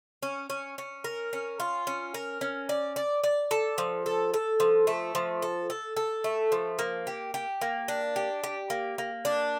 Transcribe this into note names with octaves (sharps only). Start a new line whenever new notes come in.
C#4
C#4
C#4
A#4
C#4
F4
C#4
A#4
C#4
D5
D5
D5
A4
F3
A4
A4
F3
A3
F3
A4
A4
A4
A3
F3
A#3
G4
G4
A#3
D4
G4
G4
A#3
A#3
D4